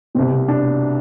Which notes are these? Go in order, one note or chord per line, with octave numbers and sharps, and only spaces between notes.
C2 B2 C4
D4